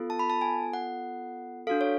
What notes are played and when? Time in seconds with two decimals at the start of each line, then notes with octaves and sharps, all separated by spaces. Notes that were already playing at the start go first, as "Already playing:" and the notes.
Already playing: B3 F4 A4
0.10 A5
0.19 B5
0.30 A5
0.41 G#5
0.73 F#5
1.67 D4 F#4 A4 F5
1.81 C#5